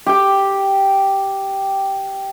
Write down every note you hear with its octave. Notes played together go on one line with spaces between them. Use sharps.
G4 G5